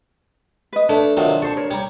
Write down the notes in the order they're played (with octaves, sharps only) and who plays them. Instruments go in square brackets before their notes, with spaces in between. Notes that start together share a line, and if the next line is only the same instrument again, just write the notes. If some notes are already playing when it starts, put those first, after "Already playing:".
[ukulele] B4 D#5
[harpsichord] A3 [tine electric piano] D4
[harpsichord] C3 D#3 F#3 [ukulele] F4
[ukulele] A4 C5 A5 [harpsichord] C#6
[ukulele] A#4 C#5
[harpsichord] G3 [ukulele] C#5 A#5